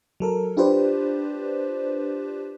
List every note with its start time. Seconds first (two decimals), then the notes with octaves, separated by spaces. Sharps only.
0.20 F#3 A4 A#4
0.57 D4 F4 G4 B4 C5 D5